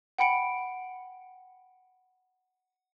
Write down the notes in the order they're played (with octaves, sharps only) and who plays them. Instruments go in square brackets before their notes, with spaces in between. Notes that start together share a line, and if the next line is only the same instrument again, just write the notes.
[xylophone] F#5 G5 B5 C#7 D7